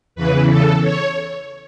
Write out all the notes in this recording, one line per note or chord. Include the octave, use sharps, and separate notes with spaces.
E2 C#3 E3 B4
A4
C#5